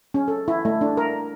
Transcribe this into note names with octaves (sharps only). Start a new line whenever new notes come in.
C#4
A4
E4
A3
D4
A#4